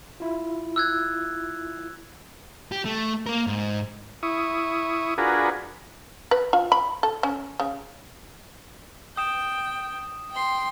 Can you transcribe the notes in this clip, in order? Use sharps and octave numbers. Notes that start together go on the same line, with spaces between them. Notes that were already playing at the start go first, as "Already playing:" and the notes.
E4 F4
E6 F#6 G#6
G4
A3
A#3 A#4
G#2
E4 C#6 D#6
D4 F4 F#4 G#4 A#4 B4
B4
F4
B5
A4
C#4
C#3
G5 D#6 E7
G5 C6